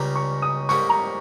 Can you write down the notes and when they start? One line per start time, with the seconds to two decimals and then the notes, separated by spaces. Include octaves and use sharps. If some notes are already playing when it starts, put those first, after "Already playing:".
Already playing: C#2 C#3 G3 A#5
0.15 C#6
0.42 D#6
0.69 G#2 G3 A#3 C#6
0.90 A#5